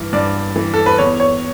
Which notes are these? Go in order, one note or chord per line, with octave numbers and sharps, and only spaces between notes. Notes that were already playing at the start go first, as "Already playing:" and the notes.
Already playing: G2 E3
G2 D5
E3
A4
B4
E2 C#5
C#5